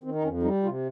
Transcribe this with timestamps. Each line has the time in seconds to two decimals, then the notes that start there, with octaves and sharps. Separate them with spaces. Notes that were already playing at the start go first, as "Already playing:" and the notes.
0.04 D#3 C4
0.15 D#4
0.23 F2 C#4
0.43 G3 D#4
0.63 C3 F4